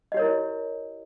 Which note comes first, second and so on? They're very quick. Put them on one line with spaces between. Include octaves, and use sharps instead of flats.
D#5 G4 C#5 A#4 E4